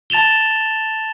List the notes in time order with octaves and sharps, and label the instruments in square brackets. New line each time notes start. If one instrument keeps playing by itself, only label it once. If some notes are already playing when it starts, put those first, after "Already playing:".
[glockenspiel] A5 A6 E7 F7 G7